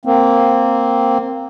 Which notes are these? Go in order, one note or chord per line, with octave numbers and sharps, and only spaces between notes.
A#3 C4